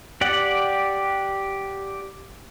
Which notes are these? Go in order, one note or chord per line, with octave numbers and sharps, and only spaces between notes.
G4 D5 F#5